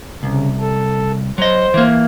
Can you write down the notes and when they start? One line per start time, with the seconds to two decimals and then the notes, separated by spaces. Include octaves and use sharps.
0.23 C2 C#3
0.60 A4
1.38 F#3 C5 D#5
1.74 E3 A#3